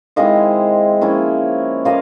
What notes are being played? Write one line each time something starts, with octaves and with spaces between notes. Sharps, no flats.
D#3 G#3 C4 E4 D#5 F5
F3 A#3 C#4 E4
F3 A#3 C#4 D#5 F5